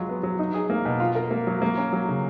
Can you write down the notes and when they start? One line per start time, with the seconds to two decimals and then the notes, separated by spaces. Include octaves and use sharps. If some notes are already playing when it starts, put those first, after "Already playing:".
Already playing: F#3 G#3 F4
0.09 B3
0.23 F#3
0.39 D#4
0.54 G#4
0.70 A#3
0.85 B2
1.00 F4
1.15 A#4
1.31 A#3
1.47 F#3
1.62 A#3
1.77 C#4
1.93 F#3
2.09 C#3